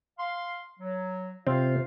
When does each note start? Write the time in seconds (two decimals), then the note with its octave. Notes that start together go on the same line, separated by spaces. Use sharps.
0.18 F5 C6
0.79 F#3
1.47 C3 C4 F4 F5